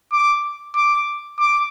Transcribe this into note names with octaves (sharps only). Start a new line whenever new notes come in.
D6
D6
D6